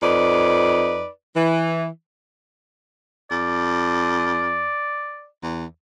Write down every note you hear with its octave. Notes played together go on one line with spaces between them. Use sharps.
F2 D#4 B4 D5
E3
F2 D5
E2